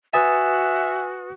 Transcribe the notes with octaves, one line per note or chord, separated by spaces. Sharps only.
F#4 B4 E5 G#5 D#6 A6